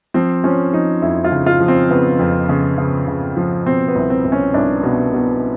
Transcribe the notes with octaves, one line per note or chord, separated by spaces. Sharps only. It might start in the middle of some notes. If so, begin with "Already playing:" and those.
F3 C4
F3 C#4
F3 D#4
F2 E4
F4
C#3
F4
F3
C4
C#3 B3
F2
C#3
C#3
C#3
F3
B2 C4
B3
C2
C4
C2
C#4
C2 D4
B2
B2